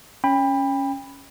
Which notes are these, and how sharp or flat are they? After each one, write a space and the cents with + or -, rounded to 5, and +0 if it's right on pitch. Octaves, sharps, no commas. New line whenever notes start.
C#4 +0 G5 +30 B5 +0